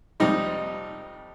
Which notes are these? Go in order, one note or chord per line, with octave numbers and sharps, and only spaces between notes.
F2 C3 G3 D#4